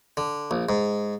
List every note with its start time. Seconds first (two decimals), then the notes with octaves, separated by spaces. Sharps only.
0.17 D3
0.51 A#1
0.69 G#2